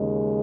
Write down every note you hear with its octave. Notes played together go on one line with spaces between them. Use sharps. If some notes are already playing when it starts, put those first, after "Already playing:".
Already playing: D#2 C#3 G#3